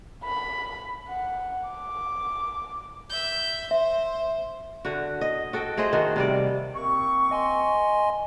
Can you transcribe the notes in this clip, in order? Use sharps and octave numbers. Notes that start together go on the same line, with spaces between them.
B5
F#5
D6
E5 G6
C5 E5
D3 F#4
D#5
F#4 A4 G5
A3 G#4 C5 D#5
D#3 F#4
C3 G3 D5
A#3 C4 C#6
D#5 G#5 C6